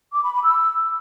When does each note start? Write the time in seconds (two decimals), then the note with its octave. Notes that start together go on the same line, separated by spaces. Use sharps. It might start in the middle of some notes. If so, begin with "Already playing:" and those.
0.13 D6
0.23 B5
0.33 B5
0.43 E6